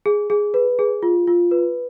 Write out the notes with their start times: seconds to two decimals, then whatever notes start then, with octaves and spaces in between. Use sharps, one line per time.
0.06 G#4
0.30 G#4
0.54 B4
0.79 G#4
1.03 F4
1.27 F4
1.51 B4